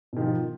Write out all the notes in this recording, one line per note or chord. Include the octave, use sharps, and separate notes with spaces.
B2 D#3 F3